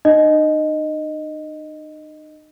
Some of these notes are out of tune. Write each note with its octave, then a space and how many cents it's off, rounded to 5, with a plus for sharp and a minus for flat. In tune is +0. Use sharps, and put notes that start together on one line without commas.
D#4 -40 D#5 -5